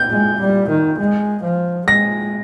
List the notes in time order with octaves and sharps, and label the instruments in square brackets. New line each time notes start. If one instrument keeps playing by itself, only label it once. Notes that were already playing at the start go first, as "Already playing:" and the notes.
Already playing: [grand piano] G6
[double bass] G#3
G3
D#3
G#3
F3
[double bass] G#3 [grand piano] A#6